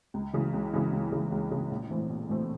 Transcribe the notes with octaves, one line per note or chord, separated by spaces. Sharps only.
C#2
C#3 E3
C#2
C#3 E3
C#2
C#3 E3
C#2
C#3 E3
A#1
A2 E3 A3 C4
A#1
A2 E3 A3 C4